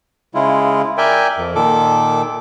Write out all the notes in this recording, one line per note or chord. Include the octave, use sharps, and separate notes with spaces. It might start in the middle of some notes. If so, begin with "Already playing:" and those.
C#3 G#3 E4 F4
A#4 D5 E5 G5 G#5
F2
A#2 D#3 A4 D6